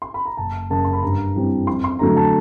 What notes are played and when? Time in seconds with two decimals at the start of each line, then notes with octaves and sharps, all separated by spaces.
0.02 C6
0.14 B5
0.25 A#5
0.37 F#1 A5
0.70 F#2 C#3 A5
0.85 C6
0.93 B5
1.03 G2 A#5
1.35 E3 G3 C4
1.67 F2 C6
1.84 C6
1.99 D3 F#3 A3 A#5
2.17 A5